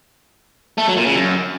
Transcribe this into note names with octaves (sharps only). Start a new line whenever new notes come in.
A3
F#3
A#2
C#3
F#2